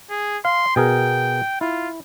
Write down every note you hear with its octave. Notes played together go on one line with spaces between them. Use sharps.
G#4
F5 C6
B2 G#4 A#4 G5
E4 F4